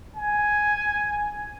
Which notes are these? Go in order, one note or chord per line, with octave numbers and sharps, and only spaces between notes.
G#5